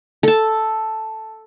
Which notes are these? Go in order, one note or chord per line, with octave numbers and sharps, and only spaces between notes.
A4 A5